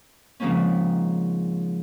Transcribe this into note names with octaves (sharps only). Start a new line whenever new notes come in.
G#2 C#3 F3 A#3 C4 C#4